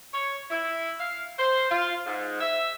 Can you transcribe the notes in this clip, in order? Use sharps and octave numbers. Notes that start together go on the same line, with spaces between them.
C#5
E4
F5
C5
F4
G#2
E5